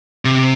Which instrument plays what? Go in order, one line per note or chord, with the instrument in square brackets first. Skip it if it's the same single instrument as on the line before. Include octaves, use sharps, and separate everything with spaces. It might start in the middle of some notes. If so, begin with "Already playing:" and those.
[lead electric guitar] C3